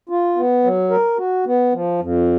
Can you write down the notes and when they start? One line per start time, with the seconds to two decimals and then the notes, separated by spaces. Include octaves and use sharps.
0.09 F4
0.36 B3
0.64 F#3
0.90 A#4
1.18 F#4
1.46 B3
1.73 F3
2.00 F2